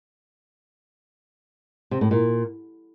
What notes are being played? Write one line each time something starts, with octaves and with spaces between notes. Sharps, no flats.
C3
A2
A#2